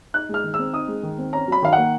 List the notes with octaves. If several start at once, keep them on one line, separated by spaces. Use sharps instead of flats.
D#4 F#6
G#3
F6
D#3
E6
C4
D#4 D#6
G#3
D#3
C4
C#4 A#5
F#3 B5
D#3 F5
A#3 F#5